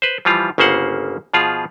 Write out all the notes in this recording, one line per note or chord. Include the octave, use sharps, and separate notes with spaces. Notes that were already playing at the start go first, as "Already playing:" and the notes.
B4 C5
E3 F3 G3 F4
G1 C#3 A#3 C5 F#5
B2 F3 F4 G#4